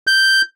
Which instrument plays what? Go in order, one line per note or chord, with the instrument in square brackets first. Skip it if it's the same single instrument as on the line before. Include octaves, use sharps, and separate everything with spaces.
[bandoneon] G6